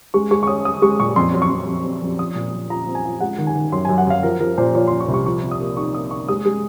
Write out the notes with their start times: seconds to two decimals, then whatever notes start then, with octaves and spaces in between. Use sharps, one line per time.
0.14 G#3 C#6
0.31 G#3 C#6
0.43 C#6
0.47 C#4 D#6
0.65 C#4 D#6
0.82 G#3 C#6
1.00 A#2 C#6
1.16 F2 C6
1.33 F#3
1.42 C#6
1.50 F2
1.67 F2
1.84 C4
2.02 F2
2.19 F3 D#6
2.35 A#2
2.53 A#2
2.70 F4 A#5
2.87 C4
2.95 G#5
3.05 F4
3.21 G#3 F#5
3.38 D#3
3.47 G#5
3.55 D#3
3.72 F#2 C6
3.85 F#2 G#5
3.98 F#5
4.07 F#2 F5
4.23 F3 A#4
4.40 F3 A#4
4.58 A#2 C5
4.75 F3 C#5
4.87 F3 C6
5.00 C#6
5.08 C2
5.14 C#6
5.26 F3 C#6
5.43 C3
5.51 D#6
5.60 A#3
5.77 D#4 C#6
5.94 A#3 D#6
6.11 A#3 C#6
6.28 G#3 D#6
6.45 G#3